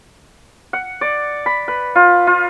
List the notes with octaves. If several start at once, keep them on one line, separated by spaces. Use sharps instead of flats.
F#5
D5
B5
B4
F4
F4